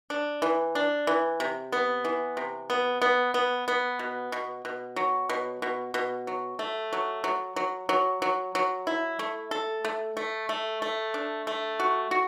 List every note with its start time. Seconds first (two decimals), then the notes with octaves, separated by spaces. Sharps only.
0.10 D4
0.42 E3
0.75 D4
1.07 E3
1.40 C3
1.72 B3
2.05 E3
2.37 C3
2.70 B3
3.02 B3
3.34 B3
3.68 B3
3.99 B2
4.32 B2
4.65 B2
4.96 F#3
5.30 B2
5.62 B2
5.94 B2
6.27 F#3
6.59 A3
6.93 F#3
7.24 F#3
7.56 F#3
7.89 F#3
8.22 F#3
8.55 F#3
8.87 E4
9.19 A3
9.51 A4
9.85 A3
10.17 A3
10.49 A3
10.82 A3
11.14 D4
11.47 A3
11.80 F#4
12.11 F#4